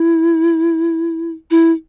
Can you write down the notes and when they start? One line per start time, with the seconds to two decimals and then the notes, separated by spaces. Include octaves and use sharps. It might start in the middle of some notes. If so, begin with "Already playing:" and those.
Already playing: E4
1.51 E4